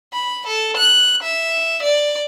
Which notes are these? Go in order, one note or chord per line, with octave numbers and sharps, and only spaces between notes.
B5
A4
F#6
E5
D5